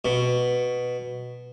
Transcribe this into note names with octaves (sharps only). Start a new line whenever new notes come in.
B2